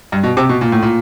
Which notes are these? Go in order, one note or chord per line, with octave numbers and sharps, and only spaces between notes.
G2
B2
C3
B2
A#2
A2
A#2